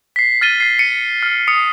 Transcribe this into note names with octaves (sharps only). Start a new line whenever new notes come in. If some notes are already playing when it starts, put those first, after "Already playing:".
B6 C7
F6 A6 D#7 G7
A6 C7
C#7 D#7
F6
D#6 C#7